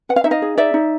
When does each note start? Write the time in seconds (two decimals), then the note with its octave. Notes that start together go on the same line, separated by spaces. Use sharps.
0.09 B4 F#5
0.16 F5
0.24 D#4 E5
0.31 D#5 F5
0.42 G#4
0.58 D#4 D5 E5
0.74 D#4